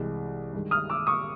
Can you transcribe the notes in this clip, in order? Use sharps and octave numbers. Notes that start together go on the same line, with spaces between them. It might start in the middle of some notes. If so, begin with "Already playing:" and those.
Already playing: C2 C3 E3 G#3
G2 D#3 G#3
D#6 F6
D6 E6
C#6 D#6